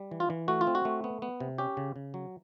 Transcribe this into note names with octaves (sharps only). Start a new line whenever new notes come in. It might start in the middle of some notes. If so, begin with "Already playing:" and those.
Already playing: G3
E3
F4
E3
A3 F#4
F4
C4
F#4
A3
B3
B3
C3
C#4 G4
C#3
C#3
F#3